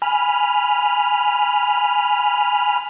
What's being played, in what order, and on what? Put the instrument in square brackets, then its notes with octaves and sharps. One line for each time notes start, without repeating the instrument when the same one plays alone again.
[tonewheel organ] G#5 B5 F6